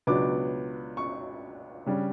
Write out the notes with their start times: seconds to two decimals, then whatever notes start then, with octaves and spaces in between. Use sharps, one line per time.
0.07 C#2 B2 F#3 B3 D4 D6
0.97 C#6
1.86 C#3 G3 D4